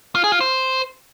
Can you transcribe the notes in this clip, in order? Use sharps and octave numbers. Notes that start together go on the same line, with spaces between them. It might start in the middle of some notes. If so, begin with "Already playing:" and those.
F4
G#4
F4
C5